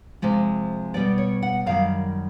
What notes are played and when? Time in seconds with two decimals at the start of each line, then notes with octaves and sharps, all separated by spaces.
0.22 C3 F3 G#3
0.94 B2 G3 B3 D5
1.18 C#5
1.42 F#5
1.66 F#2 D#3 G3 F5